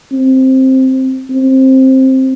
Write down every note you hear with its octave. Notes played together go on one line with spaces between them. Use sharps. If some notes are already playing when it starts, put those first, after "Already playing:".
C4
C4